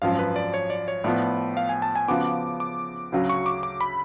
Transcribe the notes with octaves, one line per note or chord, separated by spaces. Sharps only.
G#1 F#2 F3 F5
B4
D5
C#5
D5
C#5
A2 F3 B3 D5
F5
G#5
A5
G#5
C#3 F3 B3 F#4 D6
D6
D2 C#3 F#3
C#6
D6
D6
B5